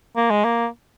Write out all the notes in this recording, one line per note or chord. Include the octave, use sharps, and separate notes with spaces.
A#3
G#3
A#3